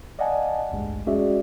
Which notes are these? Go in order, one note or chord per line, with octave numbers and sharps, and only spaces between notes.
D5 D#5 F5 F#5 G#5 A5
A1 D2 G2 G#3
G#3 C#4 F#4 G#4 D5 E5